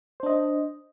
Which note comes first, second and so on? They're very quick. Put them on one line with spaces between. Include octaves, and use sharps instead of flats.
C5 D4 D#5